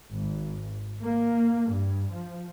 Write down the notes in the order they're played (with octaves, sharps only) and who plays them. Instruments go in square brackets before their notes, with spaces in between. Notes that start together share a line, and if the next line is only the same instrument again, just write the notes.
[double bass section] G#1
A#3
G2
F3